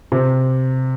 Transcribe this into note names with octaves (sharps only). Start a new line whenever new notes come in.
C3